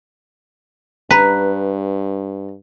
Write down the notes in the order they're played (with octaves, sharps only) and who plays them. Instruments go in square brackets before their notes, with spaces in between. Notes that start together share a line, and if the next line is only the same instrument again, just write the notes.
[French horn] G2 [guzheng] B4 [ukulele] A#5